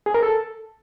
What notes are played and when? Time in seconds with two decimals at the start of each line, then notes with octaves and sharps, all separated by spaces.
0.06 G#4
0.14 A#4
0.23 A4